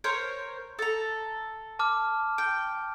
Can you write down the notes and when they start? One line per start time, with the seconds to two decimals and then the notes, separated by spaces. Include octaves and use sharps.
0.04 A#4 C5 C#5
0.79 A4 A#5
1.79 A5 D6 F6
2.38 G5